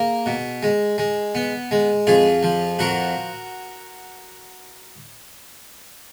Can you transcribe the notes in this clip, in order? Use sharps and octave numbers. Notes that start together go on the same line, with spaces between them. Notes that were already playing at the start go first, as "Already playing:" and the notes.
Already playing: A#3 G#4
B2
G#3
G#3
B3
G#3
F2 F4 G#4
F3
F2 F#4 A#4